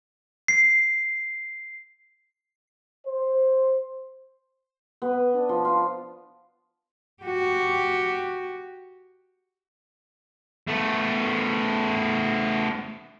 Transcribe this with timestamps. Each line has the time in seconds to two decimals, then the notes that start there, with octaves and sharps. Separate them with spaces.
0.48 C7
3.07 C5
5.02 B3
5.34 D4
5.49 F3
5.65 F4
7.23 F#4 G4
10.68 A3 B3